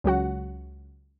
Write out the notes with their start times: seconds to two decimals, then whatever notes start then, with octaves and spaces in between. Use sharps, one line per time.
0.04 C#2 F#3 F#4 F#5